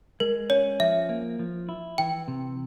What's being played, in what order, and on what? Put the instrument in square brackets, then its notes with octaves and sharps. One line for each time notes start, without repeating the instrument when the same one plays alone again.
[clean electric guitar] G#3 [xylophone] A#4
[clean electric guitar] C#4 [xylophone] C#5
[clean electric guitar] F3 [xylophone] E5
[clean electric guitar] A#3
F3
E4
[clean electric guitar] E3 [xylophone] G5
[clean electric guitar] C3